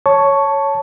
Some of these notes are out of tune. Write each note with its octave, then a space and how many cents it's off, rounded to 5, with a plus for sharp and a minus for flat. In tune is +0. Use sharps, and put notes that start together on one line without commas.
C#5 +0 A5 +0 C#6 +5